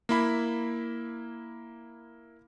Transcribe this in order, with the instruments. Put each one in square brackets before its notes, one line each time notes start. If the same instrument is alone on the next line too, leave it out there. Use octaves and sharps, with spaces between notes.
[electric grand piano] A#3 E4 B5